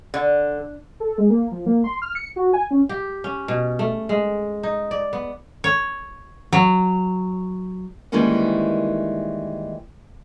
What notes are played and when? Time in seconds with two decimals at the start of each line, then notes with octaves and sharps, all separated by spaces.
0.14 D3
1.00 A4
1.18 G#3
1.30 A#3
1.51 F3
1.66 A#3
1.84 C6
2.02 F6
2.15 C#7
2.36 F#4
2.53 G#5
2.71 C#4
2.89 G4
3.24 C#4
3.48 B2
3.79 A3
4.09 G#3
4.63 D#4
4.91 D5
5.13 B3
5.64 C#5
6.53 F#3
8.12 D#3 E3 G3 G#3 A#3 C#4